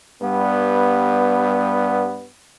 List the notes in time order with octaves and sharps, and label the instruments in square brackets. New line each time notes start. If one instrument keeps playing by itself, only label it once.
[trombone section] G2 G3 B3